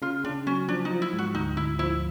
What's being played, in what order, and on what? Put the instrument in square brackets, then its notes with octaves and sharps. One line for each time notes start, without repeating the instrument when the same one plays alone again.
[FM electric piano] C#3 [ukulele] F4
[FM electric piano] C#3 [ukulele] D4
[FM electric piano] F#3 [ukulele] C#4
[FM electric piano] F3 [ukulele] D4
[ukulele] D#4
[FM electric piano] F3
[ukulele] E4
[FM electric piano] G#2 [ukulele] F#4
[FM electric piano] D2 [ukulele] D#4
[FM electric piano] D2 [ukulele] E4
[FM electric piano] F3 [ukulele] E4